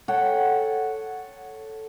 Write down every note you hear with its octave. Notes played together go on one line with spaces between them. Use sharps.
A4 C#5 F#5 G5